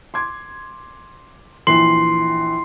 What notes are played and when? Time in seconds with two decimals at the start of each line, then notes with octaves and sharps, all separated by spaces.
0.14 C6 D6 G#6
1.67 A#1 E3 C6 C7